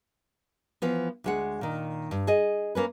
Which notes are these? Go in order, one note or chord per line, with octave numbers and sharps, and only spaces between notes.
E3 F3 B3
D2 G#3 F#5
A#2 D#3
G2
G#4 D#5
A#3 C#4 B4